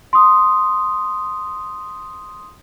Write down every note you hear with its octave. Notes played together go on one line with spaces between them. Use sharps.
C6 D#6